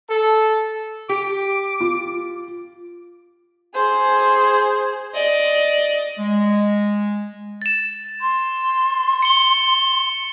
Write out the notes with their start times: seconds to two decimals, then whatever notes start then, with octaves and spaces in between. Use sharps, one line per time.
0.10 A4
1.09 G4 D6
1.80 F4
3.75 G#4 C5
5.14 D5 D#5
6.18 G#3
7.62 A6 E7
8.21 C6
9.22 C#7 G7